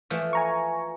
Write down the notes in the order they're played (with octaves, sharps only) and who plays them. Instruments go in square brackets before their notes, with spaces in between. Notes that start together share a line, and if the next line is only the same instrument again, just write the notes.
[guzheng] E3 F3 A3
[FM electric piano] G#5 A#5 C#6